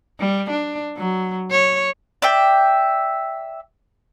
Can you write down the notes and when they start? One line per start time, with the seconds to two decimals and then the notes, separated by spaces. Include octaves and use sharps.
0.19 G3
0.50 D4
0.97 F#3
1.50 C#5
2.22 D5 E5 G5